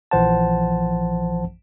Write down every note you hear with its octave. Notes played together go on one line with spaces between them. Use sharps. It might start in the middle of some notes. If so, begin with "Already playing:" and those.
A#1 E3 F3 C5 F#5 A5